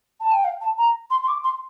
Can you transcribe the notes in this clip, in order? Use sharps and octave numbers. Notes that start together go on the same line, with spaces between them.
A5
G5
F5
A5
A#5
C6
C6
D6
C6